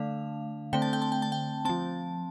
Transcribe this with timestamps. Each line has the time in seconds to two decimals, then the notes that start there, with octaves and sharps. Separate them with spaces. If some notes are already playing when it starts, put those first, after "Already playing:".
Already playing: D3 A3 D4 F5
0.73 D3 A3 C4 G5
0.82 A5
0.93 G5
1.02 A5
1.12 G5
1.22 A5
1.32 G5
1.65 F3 C4 A5